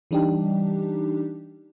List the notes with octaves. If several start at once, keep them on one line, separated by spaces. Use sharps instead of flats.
E3 G3 D4 D#4 G4